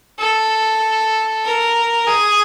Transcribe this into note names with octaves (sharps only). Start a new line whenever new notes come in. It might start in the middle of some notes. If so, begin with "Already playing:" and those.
A4
A#4
G#4